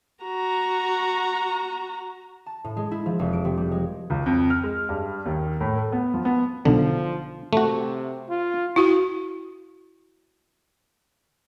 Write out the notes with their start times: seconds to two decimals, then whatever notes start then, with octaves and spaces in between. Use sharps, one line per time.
0.23 F#4 A#5
2.46 A5
2.64 A2
2.77 G#3
2.91 E4
3.06 F3
3.19 F1
3.33 D7
3.45 C3
3.57 G3
3.72 G#3
4.10 C#2
4.26 F2
4.50 F6
4.63 G#3
4.89 G2
5.26 D#2
5.60 A2
5.76 A3
5.92 B3
6.14 F3
6.25 B3
6.65 B1 D3 F3
7.53 C3 A3 F#4
8.30 F4
8.76 E4 F#4